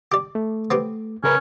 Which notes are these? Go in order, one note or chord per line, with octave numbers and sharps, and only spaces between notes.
G4 D5
A3
B3 C4 G4
C#3 C#4 A#4 B4